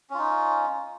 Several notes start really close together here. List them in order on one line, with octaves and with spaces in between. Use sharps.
C#4 F4 D#4